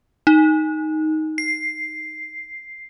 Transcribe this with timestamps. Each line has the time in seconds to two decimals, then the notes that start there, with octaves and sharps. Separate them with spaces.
0.27 D#4
1.38 C7